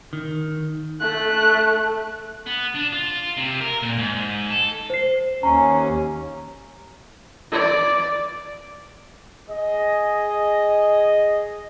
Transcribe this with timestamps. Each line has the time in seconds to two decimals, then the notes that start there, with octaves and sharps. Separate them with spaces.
0.13 D#3
1.00 A3 F#6
2.47 B3
2.75 D4
2.92 F4
3.37 C3
3.61 A#4
3.83 A#2
3.98 G#2
4.50 A4
4.90 C5 C7
5.43 D#2 C#4 A#5
7.52 D5
9.50 G#4 D#5